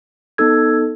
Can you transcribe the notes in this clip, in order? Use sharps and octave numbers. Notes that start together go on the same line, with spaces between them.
B3 D#4 A4 E6 G#6